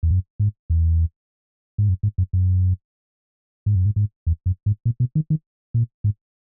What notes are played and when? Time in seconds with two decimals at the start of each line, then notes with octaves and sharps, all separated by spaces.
0.03 E2
0.10 F#2
0.40 G#2
0.70 E2
1.78 G#2
1.89 F#2
2.03 G#2
2.18 F#2
2.33 F#2
3.66 G#2
3.75 F#2
3.86 G#2
3.96 G#2
4.27 E2
4.46 F#2
4.66 G#2
4.85 A#2
5.00 B2
5.15 D#3
5.30 D#3
5.74 A#2
6.04 G#2